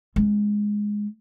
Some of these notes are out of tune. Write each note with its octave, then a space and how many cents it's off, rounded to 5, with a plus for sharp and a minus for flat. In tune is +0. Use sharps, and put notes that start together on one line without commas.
G#3 +0 C#4 -45